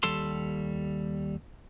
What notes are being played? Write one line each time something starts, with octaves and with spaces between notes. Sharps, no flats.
D#2 G3 A4 A5 C6